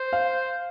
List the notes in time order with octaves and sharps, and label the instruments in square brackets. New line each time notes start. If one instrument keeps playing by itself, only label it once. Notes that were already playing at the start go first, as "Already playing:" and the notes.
Already playing: [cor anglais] C5
[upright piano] F5